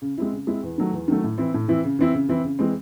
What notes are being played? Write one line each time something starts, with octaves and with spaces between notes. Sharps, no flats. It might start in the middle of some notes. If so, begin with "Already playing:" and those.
C#3
G#3 C4 E4
C#3
G#3 C4 E4
E2
D#3 F#3 A3
E2
D#3 F#3 A3
A2
E3 C4 E4
A2
E3 C4 E4
C#3
E3 C4 E4
C#3
E3 C4 E4
C#3
E3 G#3 C4